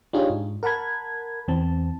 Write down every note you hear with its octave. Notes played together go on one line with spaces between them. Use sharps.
D4 D#4 F4 G4 G#4 C#5
G#2
A#4 F#5 A5 B5 G#6
E2 E3 C4 A5